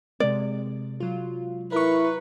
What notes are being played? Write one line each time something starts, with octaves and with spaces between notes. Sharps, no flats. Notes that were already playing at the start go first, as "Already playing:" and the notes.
C3 G#3 D5
F#3 F4
E4 A#4 B4 C#6